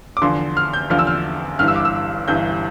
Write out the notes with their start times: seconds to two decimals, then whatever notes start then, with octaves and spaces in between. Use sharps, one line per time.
0.17 D6
0.22 E2 D3 F3 C6
0.57 F6
0.73 G6
0.90 E2 D3 F3 F6
0.99 E6
1.07 F6
1.59 G1 G2 E3 F6
1.68 E6
1.76 D6
1.85 E6
2.28 G1 G2 E3 G6